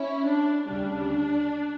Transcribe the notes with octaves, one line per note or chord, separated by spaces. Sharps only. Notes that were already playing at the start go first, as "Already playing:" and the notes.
Already playing: C#4 E4
D4
D2 C#3 G3 D4